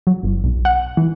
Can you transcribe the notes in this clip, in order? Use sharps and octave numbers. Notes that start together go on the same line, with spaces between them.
F#3
G1
B1
F#5
E3